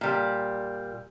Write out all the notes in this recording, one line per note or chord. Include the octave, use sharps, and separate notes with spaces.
A#2 G3